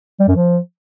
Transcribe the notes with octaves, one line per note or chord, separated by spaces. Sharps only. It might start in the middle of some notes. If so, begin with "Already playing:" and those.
G3
F#2
F3